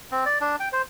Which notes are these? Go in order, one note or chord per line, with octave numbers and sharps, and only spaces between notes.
C4
D5
D4
G5
C5